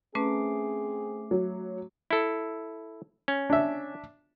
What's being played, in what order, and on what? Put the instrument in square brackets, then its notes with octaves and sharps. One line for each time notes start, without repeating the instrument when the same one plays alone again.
[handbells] A3 D6 C7 [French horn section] C4 G#4 [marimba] C#4 B4 A5
[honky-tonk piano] F#3
[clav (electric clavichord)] E4 A4
C#4
[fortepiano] D4 E5